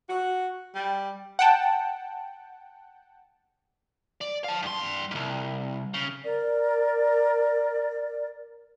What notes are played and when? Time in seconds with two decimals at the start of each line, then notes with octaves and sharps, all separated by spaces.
0.10 F#4
0.75 G3
1.39 F#5 G5 A5
4.21 D5
4.44 F5 A5
4.62 G2 C6
5.11 C2 G#2
5.94 C#3
6.23 A#4 D5